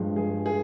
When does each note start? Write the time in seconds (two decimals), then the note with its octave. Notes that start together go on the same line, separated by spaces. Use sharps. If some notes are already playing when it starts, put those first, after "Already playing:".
Already playing: G2 F3 G#3
0.16 G#4
0.46 G#4